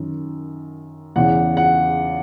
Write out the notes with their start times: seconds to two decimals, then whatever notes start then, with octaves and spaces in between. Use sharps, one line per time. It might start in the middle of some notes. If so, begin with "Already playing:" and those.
Already playing: F#2 D#3
1.16 E2 C#3 E3 F#5
1.57 F#5